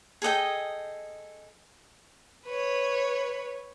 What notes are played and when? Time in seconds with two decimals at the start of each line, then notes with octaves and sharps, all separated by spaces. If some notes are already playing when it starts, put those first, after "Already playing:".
0.22 G#4 A4 D#5 G5
2.46 B4 C#5